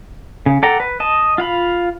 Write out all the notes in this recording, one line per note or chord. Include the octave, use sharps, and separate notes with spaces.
C#3
A4 D5 F#5 G5 A#5
B4
D#5 A5
F4 F5 B5